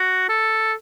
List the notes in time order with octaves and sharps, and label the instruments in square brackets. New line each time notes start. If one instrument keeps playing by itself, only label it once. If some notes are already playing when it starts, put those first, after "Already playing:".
Already playing: [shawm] F#4
A4